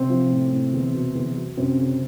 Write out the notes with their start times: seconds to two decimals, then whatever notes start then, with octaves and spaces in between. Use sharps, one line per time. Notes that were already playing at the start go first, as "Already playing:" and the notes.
Already playing: C3 C4
0.10 F3
0.31 A2
0.52 A2
0.73 E2
0.94 B2
1.15 E2
1.36 F#3
1.57 F#2 C3 C4
1.78 C#3